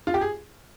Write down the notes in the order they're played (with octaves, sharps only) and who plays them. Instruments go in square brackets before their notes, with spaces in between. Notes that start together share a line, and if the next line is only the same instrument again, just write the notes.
[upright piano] F4
G4
G#4